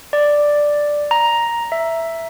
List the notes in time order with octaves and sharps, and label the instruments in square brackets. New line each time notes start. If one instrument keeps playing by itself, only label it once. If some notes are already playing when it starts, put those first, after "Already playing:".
[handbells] D5
A#5
E5